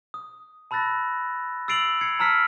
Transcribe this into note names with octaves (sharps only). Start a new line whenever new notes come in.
D#6
A5 B5 E6 F#6 A6 A#6
E6 A6 C7 D7 F7 F#7
G#6 C7 C#7
A5 A#5 E6 F6 B6 C7